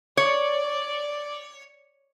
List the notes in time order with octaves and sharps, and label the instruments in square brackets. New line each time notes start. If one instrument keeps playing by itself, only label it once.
[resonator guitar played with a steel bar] C#5 [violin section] D5